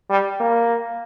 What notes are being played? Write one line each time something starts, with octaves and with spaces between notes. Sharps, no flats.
G3
A#3